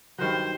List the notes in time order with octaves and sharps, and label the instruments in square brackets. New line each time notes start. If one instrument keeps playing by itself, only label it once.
[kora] G2 D#3 F#3 [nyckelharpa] C5